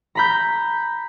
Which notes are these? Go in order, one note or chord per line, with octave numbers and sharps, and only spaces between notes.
A#5 B5 G6